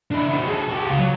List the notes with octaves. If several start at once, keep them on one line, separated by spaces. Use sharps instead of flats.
D4 E4
D#3 F#4
G#4 A4
F#4 G4
C#2 F4
F#3